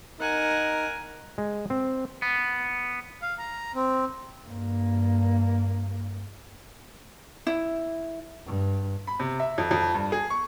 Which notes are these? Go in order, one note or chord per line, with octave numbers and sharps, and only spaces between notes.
D#4 A#4 F#5 G#5
G#3
C4
B3
F5
A#5
C4
G2 A#3
E4
G2
B5
C3
E5
F2
F2
G2
G#4
C#6